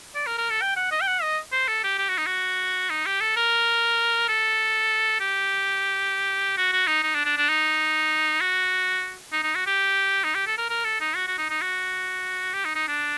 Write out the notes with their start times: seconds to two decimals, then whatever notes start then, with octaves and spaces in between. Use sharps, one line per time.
0.15 D5
0.27 A#4
0.38 A#4
0.50 A4
0.62 G5
0.76 F#5
0.91 D#5
1.01 G5
1.08 F#5
1.22 D#5
1.53 C5
1.68 A4
1.84 G4
1.99 G4
2.09 F#4
2.18 D#4
2.26 F#4
2.90 D#4
3.06 G4
3.21 A4
3.36 A#4
4.29 A4
5.20 G4
6.57 F#4
6.73 F#4
6.87 D#4
7.03 D#4
7.15 D4
7.25 D4
7.38 D4
7.49 D#4
8.40 F#4
9.33 D#4
9.43 D#4
9.55 F#4
9.67 G4
10.24 D#4
10.35 G4
10.47 A4
10.58 A#4
10.70 A#4
10.85 A4
11.01 D#4
11.16 F#4
11.27 F#4
11.38 D#4
11.50 D#4
11.62 F#4
12.54 G4
12.65 D#4
12.76 D#4
12.88 D4